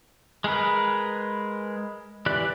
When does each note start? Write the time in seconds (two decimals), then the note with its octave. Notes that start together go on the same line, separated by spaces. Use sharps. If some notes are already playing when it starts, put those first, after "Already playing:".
0.44 G#3 G#4 A#4 B4
2.26 E3 G4 D5 F#6